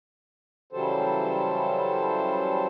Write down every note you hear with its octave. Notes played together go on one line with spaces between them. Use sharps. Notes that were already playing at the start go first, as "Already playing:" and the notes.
C#3 E3 F#3 G3 A4 C5